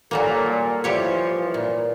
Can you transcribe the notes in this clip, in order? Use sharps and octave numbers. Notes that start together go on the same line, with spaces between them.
A#2 F#3 G3 A#3 A4
E3 F3 G3 G4 C#5
A#2